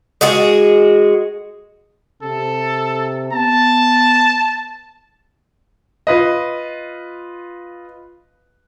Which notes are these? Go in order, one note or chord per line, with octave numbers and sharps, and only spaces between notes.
G#3 F#4 G#4
C3 A4
B3 A5
F4 B4 D#5